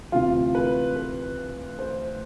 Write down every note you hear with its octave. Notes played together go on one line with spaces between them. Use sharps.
D2 C3 E3 F4
B4
B4
C5